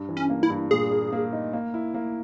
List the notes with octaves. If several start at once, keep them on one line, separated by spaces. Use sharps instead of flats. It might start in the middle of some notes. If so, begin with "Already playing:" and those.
Already playing: G2
E3
C#4
A#3
E4
G2
A#2 G#4
A#3
A#3
D#4
A#3
E4
A#3